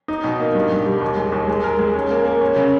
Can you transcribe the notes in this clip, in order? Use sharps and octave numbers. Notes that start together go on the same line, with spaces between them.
D#4
B2
A#3
G2
G2
G3
D#2
G#3
D#2
G#3
A#4
G#3
C#4
A#3
A#3
C#4
C#3